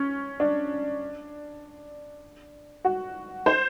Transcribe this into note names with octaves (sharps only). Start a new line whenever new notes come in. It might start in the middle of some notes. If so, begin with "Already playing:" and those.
Already playing: C#4
D4
F#4
C5